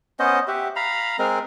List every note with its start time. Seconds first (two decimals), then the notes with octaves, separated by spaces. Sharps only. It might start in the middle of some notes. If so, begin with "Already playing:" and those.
0.19 B3 C#4 C5 D#5
0.48 G4 E5 F#5
0.76 F5 A#5 B5
1.19 G#3 C4 A#4